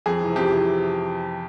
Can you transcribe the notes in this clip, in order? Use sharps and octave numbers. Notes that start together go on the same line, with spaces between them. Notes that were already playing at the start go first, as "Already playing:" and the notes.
F2 G#4
C3 E3
F2 G4
C3 E3